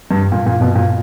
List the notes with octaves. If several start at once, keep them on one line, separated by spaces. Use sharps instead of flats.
G2
A#2
A#2
B2
A#2